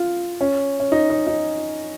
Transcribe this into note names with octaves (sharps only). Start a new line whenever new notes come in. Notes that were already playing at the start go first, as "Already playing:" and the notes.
Already playing: F4
C#4
C#4
D#4
D#4
D#4